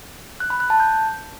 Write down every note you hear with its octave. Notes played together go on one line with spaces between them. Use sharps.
F#6
B5
F#6
A5
G6